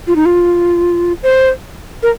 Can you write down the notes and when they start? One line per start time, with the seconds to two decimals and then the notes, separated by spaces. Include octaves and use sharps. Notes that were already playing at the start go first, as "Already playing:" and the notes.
0.07 F4
0.16 D#4
0.26 F4
1.23 C5
2.03 A#4